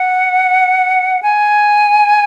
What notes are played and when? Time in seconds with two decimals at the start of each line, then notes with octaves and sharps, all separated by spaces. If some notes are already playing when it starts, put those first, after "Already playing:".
Already playing: F#5
1.23 G#5